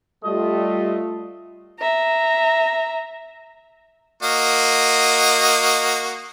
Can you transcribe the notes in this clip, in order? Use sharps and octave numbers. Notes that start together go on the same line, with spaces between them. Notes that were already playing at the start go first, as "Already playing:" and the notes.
G3 A3 F4 D#5
E5 A#5
A#3 F#4 D#5